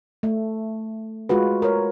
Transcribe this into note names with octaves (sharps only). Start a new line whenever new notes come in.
A3
G#3 F4 F#4 B4
A#4 C#5